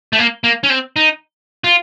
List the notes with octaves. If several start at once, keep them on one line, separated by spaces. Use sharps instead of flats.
A3
A#3
A#3
C#4
C4
D#4
F4